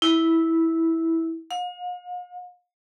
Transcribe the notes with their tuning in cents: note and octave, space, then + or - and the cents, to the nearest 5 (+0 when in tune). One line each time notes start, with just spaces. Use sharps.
E4 -10
F5 +45